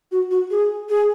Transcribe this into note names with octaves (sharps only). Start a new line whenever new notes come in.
F#4
F#4
G#4
G#4